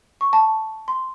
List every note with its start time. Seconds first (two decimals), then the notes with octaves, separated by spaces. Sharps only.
0.21 C#6
0.33 A5
0.88 C6